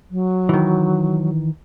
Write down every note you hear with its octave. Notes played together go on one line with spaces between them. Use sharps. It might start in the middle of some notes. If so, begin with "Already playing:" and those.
F#3
D#3 E3